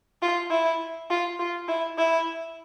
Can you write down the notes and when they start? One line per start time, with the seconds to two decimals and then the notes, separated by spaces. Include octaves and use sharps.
0.22 F4
0.51 E4
1.11 F4
1.39 F4
1.68 E4
1.98 E4